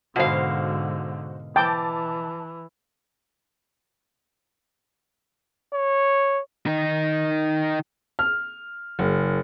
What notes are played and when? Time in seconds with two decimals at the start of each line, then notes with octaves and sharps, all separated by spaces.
0.16 G#2 B2 D3 F#4 C5 F5
1.56 E3 G5 A5 D6 A6
5.73 C#5
6.66 D#3 D#4
8.19 F6
8.99 F#1